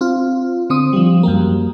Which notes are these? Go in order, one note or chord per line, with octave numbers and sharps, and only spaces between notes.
C4 F4
D3 C4 D#6
F3 G3
F#2 G3 A#3